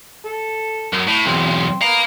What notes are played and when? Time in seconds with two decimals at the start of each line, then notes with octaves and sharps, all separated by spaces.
0.25 A4
0.93 F#2
1.08 A2 E4
1.26 B1 E2 C4
1.81 B3 F5 A#5